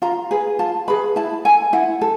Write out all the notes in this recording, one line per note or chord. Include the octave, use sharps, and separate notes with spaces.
F4 A#5
G#4 B4
F4 A5
G#4 B4 B5
E4 A5
A4 G#5
E4 F#5
A4